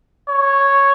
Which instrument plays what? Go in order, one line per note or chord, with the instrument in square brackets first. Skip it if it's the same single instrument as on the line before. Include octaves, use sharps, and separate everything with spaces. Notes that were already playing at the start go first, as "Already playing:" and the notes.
[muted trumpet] C#5